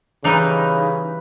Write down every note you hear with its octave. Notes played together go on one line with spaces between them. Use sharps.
C#3 E3 G3 D#4 B4 C6